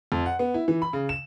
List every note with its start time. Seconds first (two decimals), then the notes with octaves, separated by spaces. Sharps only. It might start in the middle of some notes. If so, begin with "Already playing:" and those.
0.12 F2
0.26 F#5
0.39 B3
0.54 E4
0.68 E3
0.82 B5
0.93 C#3
1.09 E7